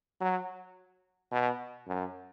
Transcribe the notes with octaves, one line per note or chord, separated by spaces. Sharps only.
F#3
B2
F#2